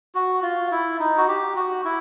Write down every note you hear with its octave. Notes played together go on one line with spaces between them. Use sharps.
F#4
F4
E4
D#4
F#4
G4
F#4
E4